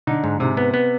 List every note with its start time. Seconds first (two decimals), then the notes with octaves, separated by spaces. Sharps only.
0.07 D3 D#4
0.24 G#2
0.40 G#2 C3
0.57 B3
0.74 B3